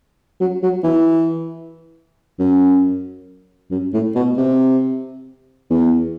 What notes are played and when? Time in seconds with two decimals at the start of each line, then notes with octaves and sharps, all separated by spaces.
0.40 F#3
0.63 F#3
0.84 E3
2.39 F#2
3.71 F#2
3.93 A2
4.15 B2
4.37 C3
5.70 E2